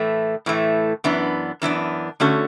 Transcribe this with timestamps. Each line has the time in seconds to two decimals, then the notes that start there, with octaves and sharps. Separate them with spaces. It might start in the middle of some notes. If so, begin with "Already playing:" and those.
Already playing: A2 E3 A3
0.46 A2 E3 A3
1.04 F#2 E3 B3 D4
1.62 F#2 E3 B3 D4
2.20 D3 A3 C#4 F#4 A4